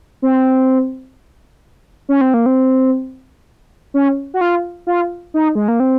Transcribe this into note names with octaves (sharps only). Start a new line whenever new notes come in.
C4
C#4
C4
A#3
C4
C#4
F#4
F4
F4
D#4
G#3
A#3
C4